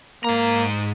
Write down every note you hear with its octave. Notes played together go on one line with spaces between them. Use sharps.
G#2 A#3 A#5